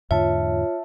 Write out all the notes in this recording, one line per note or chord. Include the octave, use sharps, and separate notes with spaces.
E2 G#2 D3 F4 C#5 E5 A5